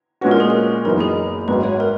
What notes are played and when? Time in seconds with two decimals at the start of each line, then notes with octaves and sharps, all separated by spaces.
0.21 A#2 G#3 C#4 F#4 B4
0.31 A#4
0.40 G#4
0.50 A#4
0.85 F#1 F#2 E3 B3 D#4 A#4
1.00 G#4
1.48 G#1 G#2 F#3 B4
1.64 C#5
1.80 A#4